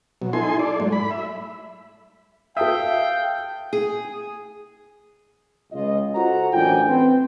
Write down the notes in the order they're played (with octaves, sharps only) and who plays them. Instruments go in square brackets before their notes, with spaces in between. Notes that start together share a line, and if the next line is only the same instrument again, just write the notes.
[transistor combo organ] B2 F#3
D#4 E4 A4 G#5 C6
A4 D5
G#2 F#3 A3
B5
E5
[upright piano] A4 A5 D#6 [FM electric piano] E5 [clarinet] F5 [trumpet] G5
[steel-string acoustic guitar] G#4
[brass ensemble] C#2 F4 D#5
F4 F#4 A4 C5 A#5
A1 F#2 D4 C5 G5 G#5
C4 B4 G5